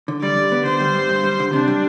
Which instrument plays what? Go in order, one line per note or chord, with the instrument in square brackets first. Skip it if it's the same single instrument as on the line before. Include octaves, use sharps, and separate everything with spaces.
[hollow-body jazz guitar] D3
[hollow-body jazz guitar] G3 [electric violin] D5
[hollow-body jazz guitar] D3
B3
[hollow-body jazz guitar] D3 [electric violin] C5
[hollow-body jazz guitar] G3
G2
G2
G3
D3
[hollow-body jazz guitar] C3 [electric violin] D4
[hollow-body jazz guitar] G3